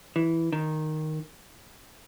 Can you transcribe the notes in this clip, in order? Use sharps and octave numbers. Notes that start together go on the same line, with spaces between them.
E3
D#3